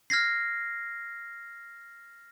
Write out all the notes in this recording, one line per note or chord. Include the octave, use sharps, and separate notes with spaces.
F6 G#6 A#6 C7